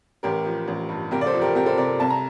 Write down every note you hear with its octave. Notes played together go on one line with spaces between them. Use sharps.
A1 G4 A#4
F3
A1
G2
C2 G4 A#4
D5
A4 C5
F3
G4 A#4
C2 G4 A#4
A4 C5
C3 A#4 D5
C2 A5
A#5